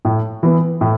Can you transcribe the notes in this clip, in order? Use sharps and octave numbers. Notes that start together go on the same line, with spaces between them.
A2
E3 B3
A2